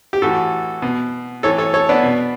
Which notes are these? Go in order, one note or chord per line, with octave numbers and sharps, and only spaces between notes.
G4
A2 E3 F#4 A4
B2
A2 E3 A4 C#5
A4 C#5
A4 C#5
B3 D4
B2